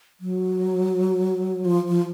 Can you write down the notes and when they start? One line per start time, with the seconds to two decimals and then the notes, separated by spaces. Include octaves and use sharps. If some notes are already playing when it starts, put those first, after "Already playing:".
0.20 F#3
1.65 F3
1.88 F3